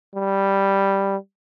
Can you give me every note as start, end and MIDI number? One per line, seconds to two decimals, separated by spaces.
0.15 1.17 55